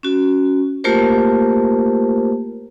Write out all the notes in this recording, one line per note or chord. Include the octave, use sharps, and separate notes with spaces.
C#4 F#4
A3 A#3 F4 G4 A#4 C5